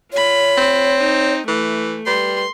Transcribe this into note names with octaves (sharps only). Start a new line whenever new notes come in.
F4 C#5 B5
C4
D#4
E3 A3
G3 B4 C6